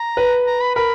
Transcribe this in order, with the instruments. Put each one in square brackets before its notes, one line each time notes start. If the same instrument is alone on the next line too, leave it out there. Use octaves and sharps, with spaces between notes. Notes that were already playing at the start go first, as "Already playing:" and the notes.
Already playing: [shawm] A#5
[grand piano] B4
[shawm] A#5
B5
[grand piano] A#4 [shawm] B5